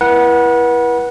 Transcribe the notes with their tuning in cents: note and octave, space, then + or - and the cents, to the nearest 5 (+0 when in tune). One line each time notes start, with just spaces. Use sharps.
E4 +15 B4 -35 F#5 +0